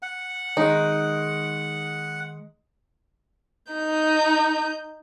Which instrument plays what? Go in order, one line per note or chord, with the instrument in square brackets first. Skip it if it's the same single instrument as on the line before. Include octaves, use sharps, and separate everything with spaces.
[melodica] F#5
[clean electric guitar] D#3 G#3 [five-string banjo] D#4
[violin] D#4 G6